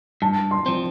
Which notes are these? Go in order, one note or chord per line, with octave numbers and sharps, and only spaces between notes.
G2 A5
C6
F3 C4